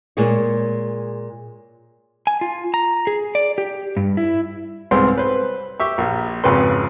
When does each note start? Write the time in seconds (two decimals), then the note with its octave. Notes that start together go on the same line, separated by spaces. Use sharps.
0.17 A#2 G#3 G#4 C#5
2.27 G#5
2.41 F4
2.74 A#5
3.07 G#4
3.35 D5
3.58 G4
3.97 G2
4.17 E4
4.91 C2 G#2 B3 C4 G#4 C6
5.18 B4 C5
5.80 G4 E5 C#6
5.98 A#1 A#2
6.44 G#1 F2 C#3 G#4 B4 C6